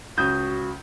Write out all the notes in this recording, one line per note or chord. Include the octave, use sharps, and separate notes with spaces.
C#2 F#4 D#6 G6